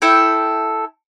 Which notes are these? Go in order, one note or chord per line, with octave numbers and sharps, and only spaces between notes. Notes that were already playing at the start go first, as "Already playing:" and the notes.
E4 A4 G5